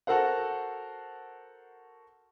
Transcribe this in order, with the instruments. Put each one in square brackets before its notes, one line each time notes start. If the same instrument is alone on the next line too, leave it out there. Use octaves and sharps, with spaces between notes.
[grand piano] F#4 A4 A#4 C5 F#5